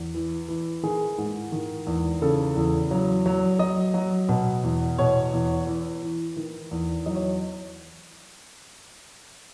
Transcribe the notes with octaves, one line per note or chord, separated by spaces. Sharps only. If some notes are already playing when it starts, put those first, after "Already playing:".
Already playing: E2
E3
E3
D#3 G#4
G#2
D#3
E2
C#3 A4
E2
F#3
F#3
F#3 D#5
F#3
B2
E2
B2 C#5
E2
E3
E3
D#3
E2
F#3 D#5
C#5